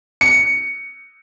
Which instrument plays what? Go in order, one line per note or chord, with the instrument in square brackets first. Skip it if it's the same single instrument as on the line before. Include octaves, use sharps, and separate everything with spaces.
[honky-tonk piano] C#7